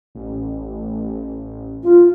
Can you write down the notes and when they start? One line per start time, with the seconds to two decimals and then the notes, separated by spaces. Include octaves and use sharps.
0.15 A1
1.83 D#1 F4